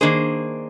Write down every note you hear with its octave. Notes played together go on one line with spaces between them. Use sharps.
D#3 A#3 D4 G#4 C5